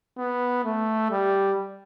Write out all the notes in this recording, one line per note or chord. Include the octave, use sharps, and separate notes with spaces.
B3
A3
G3